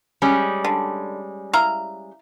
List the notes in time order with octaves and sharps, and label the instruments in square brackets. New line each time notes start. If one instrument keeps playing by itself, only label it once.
[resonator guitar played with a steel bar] G3 G#3 C#4
[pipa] D3
E4 F5 A#5